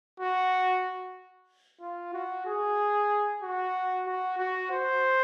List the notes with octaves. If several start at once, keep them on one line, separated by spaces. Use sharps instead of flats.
F#4
F4
F#4
G#4
F#4
F#4
F#4
C5